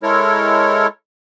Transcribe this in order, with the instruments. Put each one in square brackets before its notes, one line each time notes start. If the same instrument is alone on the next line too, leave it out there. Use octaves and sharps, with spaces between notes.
[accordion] G#3 E4 A4 A#4 C#5